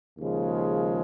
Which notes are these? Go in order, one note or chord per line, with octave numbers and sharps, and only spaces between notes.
D#2 C#3 F3 G#3